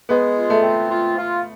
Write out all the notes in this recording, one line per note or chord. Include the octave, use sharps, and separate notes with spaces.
G#3 B3
F4
A3
C4
F4
F4